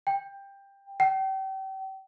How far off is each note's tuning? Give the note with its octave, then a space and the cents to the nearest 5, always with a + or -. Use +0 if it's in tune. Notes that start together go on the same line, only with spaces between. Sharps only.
G5 +15
G5 -35